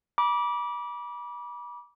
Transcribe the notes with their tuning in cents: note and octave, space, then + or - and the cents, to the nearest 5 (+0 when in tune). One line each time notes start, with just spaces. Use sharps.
B5 -35 D6 -10